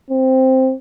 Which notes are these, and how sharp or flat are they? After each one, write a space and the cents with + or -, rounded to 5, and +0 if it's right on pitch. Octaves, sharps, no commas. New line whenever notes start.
C4 +0